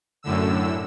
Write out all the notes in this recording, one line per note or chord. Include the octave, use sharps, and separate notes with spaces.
F#2 A2 D3 E6